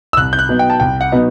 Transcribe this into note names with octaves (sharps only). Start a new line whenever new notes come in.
E6
C2 F#6
G6
F#6
B2 F#3 B3 D#4
G5
A5
C2 G5
F#5
B2 F#3 B3 D#4